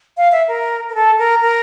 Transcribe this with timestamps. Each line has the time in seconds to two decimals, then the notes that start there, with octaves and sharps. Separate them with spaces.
0.17 F5
0.32 E5
0.48 A#4
0.90 A#4
0.95 A4
1.19 A#4
1.41 A#4